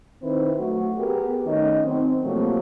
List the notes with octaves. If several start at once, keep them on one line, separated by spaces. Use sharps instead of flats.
D#3 C4 E4 B4 C5
F#3 A3 F#4
B3 G4 G#4 A#4
D#3 A3 C#4 A#4 D#5
D#3 F#3 C4
C3 F3 F#3 A3 A#3